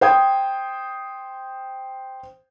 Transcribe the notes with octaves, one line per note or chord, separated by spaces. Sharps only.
C5 G5 D#6 G#6